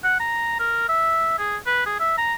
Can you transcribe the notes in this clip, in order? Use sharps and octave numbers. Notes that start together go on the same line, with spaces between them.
F#5
A#5
A#4
E5
G#4
B4
G#4
E5
A#5